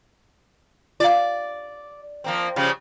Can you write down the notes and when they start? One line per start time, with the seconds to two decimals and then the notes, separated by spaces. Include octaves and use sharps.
1.00 F4 D5 F5
2.24 F3 A#3 C4
2.56 C#3 F3 G3